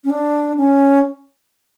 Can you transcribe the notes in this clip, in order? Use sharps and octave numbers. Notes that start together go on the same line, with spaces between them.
C#4
D4
C#4